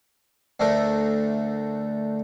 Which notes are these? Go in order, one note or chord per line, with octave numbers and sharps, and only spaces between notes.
D2 D3 A3 A#4